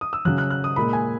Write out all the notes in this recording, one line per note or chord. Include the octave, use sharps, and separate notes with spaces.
D#6
E6
C#3 F#3 F#6
F#6
F#6
D#6
A#2 G#3 B5
G#5